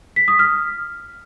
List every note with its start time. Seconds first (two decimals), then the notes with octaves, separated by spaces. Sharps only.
0.16 B6
0.28 D#6
0.39 F6